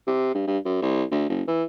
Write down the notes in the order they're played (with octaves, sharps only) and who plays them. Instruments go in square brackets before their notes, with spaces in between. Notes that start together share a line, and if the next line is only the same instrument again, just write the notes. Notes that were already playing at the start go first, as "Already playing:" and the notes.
[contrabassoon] C3
G2
G2
F#2
C2
D2
F#1
E3